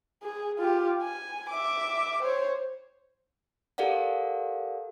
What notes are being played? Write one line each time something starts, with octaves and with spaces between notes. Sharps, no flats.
G#4
F4 G4
G#5
E5 D6
C5 C#5
G4 A4 A#4 D5 F5 F#5